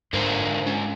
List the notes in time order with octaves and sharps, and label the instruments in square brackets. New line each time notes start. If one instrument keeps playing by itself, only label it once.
[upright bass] G#2 [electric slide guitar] D3 A#4 C5
[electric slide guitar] G#3 C#4